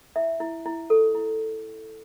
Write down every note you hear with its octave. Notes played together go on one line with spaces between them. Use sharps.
E4 E5
E4
E4
A4
E4